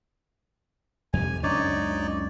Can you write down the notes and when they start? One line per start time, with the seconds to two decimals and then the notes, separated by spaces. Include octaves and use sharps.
1.13 F2 C3 G#5
1.43 C#2 F#2 D4 D#4 C#5 D5